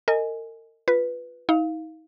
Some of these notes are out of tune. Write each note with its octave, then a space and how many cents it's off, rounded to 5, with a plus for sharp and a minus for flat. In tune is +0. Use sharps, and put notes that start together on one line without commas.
A#4 -40 D#5 +0 G#5 +5
F4 +0 B4 +0
D#4 +40 F5 +0